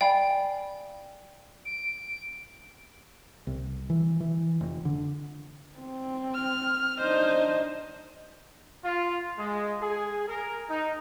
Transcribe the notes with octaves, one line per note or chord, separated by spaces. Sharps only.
D5 F5 G5 G#5 B5
D7
C2
E3
E3
F1
D3
C4
F6
D4 D#4 C5 D#5
F4
G#3
G#4
A#4
D#4